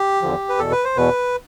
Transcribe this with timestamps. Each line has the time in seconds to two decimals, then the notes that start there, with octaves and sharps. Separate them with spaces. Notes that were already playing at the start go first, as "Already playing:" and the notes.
Already playing: G4
0.22 E2 D3 F3
0.49 B4
0.59 E2 B2 A4
0.72 B4
0.84 C5
0.96 E2 B2 B4